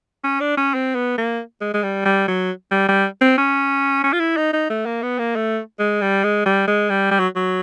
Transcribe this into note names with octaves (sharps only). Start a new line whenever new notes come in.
C#4
D4
C#4
C4
B3
A#3
G#3
G#3
G3
G3
F#3
G3
G3
C4
C#4
C#4
F4
E4
D#4
D#4
A3
A#3
B3
A#3
A3
G#3
G3
G#3
G3
G#3
G3
G3
F#3
F#3